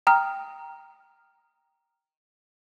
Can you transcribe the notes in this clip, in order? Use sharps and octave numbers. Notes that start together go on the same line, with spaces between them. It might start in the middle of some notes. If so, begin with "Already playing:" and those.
G5 A#5 D#6 F6